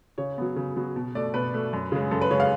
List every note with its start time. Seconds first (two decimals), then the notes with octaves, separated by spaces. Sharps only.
0.18 C#3 C#5
0.38 F#3 B3
0.56 C#3
0.76 F#3 B3
0.96 B2
1.15 A3 D5
1.34 B2 B4
1.54 A3
1.73 F#2
1.92 C#3 G#3
2.11 F#2 A4
2.21 B4
2.31 C#3 G#3 C#5
2.40 F5